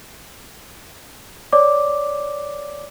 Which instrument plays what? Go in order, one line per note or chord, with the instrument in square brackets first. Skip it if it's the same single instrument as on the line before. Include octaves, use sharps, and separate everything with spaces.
[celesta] C#5 D5 D6